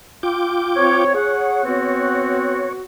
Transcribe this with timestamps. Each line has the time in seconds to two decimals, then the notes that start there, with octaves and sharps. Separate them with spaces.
0.23 F4 G5 D6
0.76 C4 C#5
1.15 G#4 C#5 F#5
1.65 B3 C4 F#4